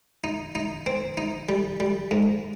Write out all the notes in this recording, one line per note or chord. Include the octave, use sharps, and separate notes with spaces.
D#4
D#4
C4
D#4
G3
G3
G#2